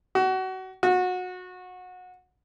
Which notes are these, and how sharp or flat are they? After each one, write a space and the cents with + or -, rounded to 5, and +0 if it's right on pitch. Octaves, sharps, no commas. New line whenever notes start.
F#4 +25
F#4 -25